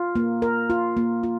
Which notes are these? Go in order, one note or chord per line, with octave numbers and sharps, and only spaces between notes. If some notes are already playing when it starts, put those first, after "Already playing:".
Already playing: F4
A#3
A#4
F4
A#3
F4